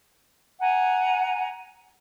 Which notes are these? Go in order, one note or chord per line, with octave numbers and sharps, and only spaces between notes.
F#5 G#5 A#5